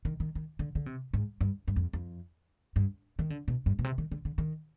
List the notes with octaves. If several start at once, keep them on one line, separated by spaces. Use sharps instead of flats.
D#3
D#3
D#3
D3
D3
C3
G#2
G2
G2
F2
F2
G2
D#3
D3
B2
G2
B2
C3
D#3
D3
D3
D#3